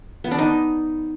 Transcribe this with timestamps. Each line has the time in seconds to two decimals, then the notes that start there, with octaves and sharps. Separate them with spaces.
0.24 B3
0.31 D4
0.38 D#4